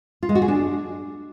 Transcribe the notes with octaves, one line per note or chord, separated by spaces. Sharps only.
F4
G#3
F#4
G#4
D4